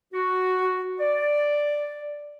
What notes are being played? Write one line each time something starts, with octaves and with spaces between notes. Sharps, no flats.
F#4
D5